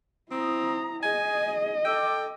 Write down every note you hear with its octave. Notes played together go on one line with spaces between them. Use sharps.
C4 E4 A#5 D#6
G#4 D#5 G#5
A4 G5 D6 E6